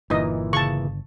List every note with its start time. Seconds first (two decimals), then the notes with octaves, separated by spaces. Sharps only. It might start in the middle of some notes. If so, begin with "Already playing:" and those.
0.10 G1 A#2 E3 D#4 D#5
0.53 C#3 A5 C#6